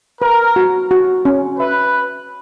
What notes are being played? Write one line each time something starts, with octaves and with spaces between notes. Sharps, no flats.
A#4 B4
F#4
F#4
C#4
B4 E5